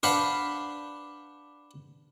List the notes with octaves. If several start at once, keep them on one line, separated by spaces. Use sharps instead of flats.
D4 B4 C5 F5 F#5 B5